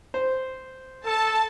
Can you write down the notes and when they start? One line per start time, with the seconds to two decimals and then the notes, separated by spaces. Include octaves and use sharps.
0.14 C5
1.05 A4 A5